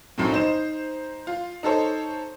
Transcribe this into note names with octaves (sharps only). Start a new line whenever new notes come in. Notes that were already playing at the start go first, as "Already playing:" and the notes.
B1 F#2 A2 C4
D#4 C5 E7
F4
D#4 A4 C5 C#5